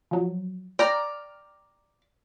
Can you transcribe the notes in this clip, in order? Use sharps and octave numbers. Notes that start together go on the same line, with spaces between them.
F3 F#3
D5 G5 A#5 F6